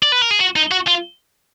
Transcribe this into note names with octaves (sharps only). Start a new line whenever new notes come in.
D5
B4
A#4
G#4
F#4
D#4
F#4
F4